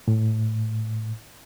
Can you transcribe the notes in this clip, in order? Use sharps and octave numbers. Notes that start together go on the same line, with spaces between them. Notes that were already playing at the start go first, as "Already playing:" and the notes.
A2